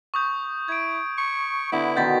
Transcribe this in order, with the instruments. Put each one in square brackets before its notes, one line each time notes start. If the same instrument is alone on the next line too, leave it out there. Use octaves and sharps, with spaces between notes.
[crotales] C#6 D#6 G6
[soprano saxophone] E4 [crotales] G#6 D7
[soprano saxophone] C#6
[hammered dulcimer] D3 B3 [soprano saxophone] E4
[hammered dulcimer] B2 D3 D#3 [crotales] G6 A6 B6